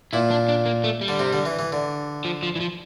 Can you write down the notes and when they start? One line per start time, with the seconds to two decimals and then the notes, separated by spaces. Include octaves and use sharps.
0.13 A#2 E4
0.31 D4
0.49 D4
0.66 A#3
0.84 A3
1.01 G3
1.08 D3
1.19 C3
1.33 D3
1.45 E3
1.59 E3
1.72 D3
2.25 F3
2.43 F3
2.56 E3
2.60 F3